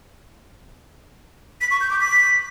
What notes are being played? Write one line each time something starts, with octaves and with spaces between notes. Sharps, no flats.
B6
C#6
G6
D6
B6